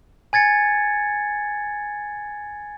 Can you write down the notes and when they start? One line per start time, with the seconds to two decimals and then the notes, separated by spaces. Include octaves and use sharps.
0.33 G#5 G#6 A6 C#7